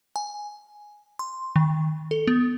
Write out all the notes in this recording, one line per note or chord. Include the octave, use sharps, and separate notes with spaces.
G#5
C6
D#3
A4
B3